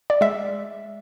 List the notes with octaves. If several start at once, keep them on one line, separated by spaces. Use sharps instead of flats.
D5
G#3 E5